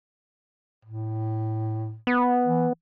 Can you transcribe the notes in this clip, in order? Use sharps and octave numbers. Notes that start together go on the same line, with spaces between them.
A2
B3
E3